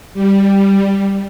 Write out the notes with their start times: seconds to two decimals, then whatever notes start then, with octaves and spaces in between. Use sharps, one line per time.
0.14 G3